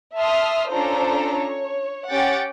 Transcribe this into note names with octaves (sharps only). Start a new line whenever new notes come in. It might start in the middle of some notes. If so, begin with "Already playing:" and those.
E5 A5 C6 D#6 F6
C#4 D4 F4 A4 C5 A#5
C#5
C#4 G4 F#5 G5 A6